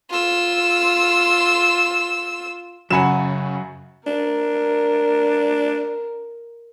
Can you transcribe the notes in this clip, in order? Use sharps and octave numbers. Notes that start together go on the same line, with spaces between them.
F4 E6
F#2 C#3 F#3 F#4 F#5 G#5 B5 E7
D4 A#4